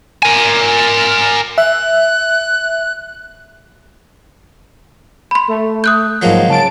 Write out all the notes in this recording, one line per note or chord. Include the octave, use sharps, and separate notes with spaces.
A#4 G#5
E5 F#6
B5 C6
A3
D#6 F#6 G6
G#2 F3 F#3 G#3 A#3
C#3 A5 D7